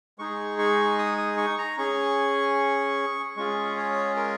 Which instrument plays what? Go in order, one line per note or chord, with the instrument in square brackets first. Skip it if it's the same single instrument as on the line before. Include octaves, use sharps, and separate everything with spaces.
[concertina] G#3 D#4 G#4 C#6
C#6
D#6
D#6
C#6
A#5
C#4 G#4 C#6
G#3 C#4 F4 G#4 C#6
C#5
A#4